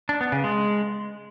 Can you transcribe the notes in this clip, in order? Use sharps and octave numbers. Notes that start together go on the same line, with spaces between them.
D4
B3
C#3
G#3